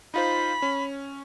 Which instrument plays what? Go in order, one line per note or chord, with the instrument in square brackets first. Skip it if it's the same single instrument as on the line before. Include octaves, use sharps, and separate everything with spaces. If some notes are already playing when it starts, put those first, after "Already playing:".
[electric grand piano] D#4 F4 C5 [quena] B5
[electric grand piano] C#4